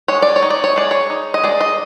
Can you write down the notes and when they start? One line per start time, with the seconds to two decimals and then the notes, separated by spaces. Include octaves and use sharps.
0.08 G#3 C#5
0.22 D5
0.36 C#5
0.42 D#4
0.50 D5
0.64 C#5
0.76 G#3 D5
0.91 C#5
1.10 D#4
1.34 D#5
1.44 G#3 D5
1.61 D#5